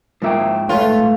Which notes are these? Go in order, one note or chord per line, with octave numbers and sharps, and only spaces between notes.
G#2 F3 A#3 E5 G5
A3 F4 B4 C#5